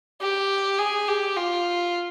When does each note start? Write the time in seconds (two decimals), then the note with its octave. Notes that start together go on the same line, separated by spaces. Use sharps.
0.21 G4
0.79 G#4
1.08 G4
1.37 F4